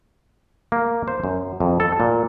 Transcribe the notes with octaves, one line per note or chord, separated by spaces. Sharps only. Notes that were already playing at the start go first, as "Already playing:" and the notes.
A#3
C5
F#2
F2
A4
A#2